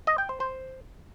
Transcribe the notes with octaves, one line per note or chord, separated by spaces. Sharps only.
D#5
G5
C5
C5